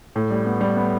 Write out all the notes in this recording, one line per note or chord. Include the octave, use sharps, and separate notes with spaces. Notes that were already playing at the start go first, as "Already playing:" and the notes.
A2
G3
B3
G3
B3